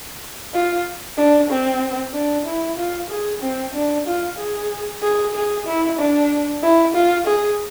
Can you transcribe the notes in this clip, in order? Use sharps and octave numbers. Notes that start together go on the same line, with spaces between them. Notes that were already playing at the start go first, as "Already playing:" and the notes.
F4
D4
C4
D4
E4
F4
G#4
C4
D4
F4
G#4
G#4
G#4
E4
D4
E4
F4
G#4